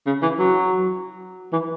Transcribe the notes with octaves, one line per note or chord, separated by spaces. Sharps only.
C#3
E3
F#3
E3